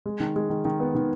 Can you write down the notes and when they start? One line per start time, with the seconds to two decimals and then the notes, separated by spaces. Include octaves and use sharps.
0.06 G#3
0.20 D#3
0.36 G#3
0.50 D#3
0.65 D#3
0.80 B3
0.95 D#3